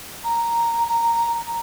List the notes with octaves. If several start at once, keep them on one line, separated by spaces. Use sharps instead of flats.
A#5
A#5